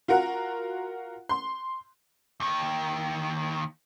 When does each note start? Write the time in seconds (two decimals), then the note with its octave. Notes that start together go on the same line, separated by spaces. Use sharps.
0.08 F4 F#4 A#4 F#5
1.29 C6
2.40 D#2 D#3